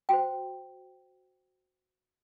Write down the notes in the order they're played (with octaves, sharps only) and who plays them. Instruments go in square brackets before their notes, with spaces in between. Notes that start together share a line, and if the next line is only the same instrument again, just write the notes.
[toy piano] F#4 C5 G5